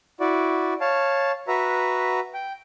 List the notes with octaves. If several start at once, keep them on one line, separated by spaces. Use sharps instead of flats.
E4 F#4 D5
C#5 F5 A5
F#4 B4 E5 A#5
G5